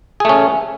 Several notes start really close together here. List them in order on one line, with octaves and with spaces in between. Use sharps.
G#4 A3 C#4